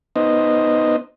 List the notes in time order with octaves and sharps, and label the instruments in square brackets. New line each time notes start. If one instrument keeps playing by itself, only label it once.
[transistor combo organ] B3 D#4 C5 D#5